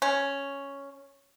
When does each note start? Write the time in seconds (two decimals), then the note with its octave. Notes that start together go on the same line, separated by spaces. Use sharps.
0.02 C#4